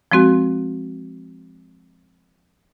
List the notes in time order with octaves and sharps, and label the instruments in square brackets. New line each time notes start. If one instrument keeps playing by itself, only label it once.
[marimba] F3 G#3 C4 F#4